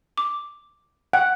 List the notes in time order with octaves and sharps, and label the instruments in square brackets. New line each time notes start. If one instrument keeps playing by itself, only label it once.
[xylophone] D6
[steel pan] F#5 [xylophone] G5